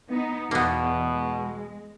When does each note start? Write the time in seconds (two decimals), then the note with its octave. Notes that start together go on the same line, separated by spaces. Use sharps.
0.10 B3 D#4
0.51 E2 B2 A#3 B3
1.02 G#3